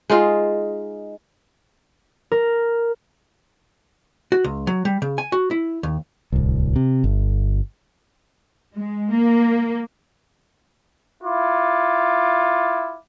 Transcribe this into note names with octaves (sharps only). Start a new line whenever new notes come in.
G#3 D#4 F4
A#4
F#4
C#2
F#3
G3
C#3
G#5
F#4
E4
D#2
D1 C2
C3
G1
G#3
A#3
E4 F4 D6